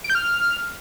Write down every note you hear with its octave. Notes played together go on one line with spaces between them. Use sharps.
D7
G6
F6